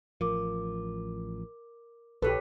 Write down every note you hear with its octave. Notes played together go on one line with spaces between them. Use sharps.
A1 F3 A#4 D6
A#1 G4 A4 B4 C#5